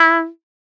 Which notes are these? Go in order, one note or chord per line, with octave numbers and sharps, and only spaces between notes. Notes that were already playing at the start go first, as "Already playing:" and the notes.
Already playing: E4